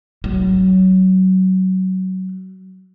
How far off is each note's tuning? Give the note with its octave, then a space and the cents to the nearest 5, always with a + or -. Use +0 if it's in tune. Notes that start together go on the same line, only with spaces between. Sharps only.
F#3 +20